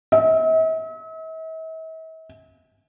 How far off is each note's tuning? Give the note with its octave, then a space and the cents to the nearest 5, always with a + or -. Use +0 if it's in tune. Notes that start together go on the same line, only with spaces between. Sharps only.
E5 -45